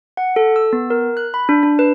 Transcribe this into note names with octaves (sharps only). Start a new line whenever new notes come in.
F#5
A4
E6
B3
A#4
F#6
B5
D4
D4
B4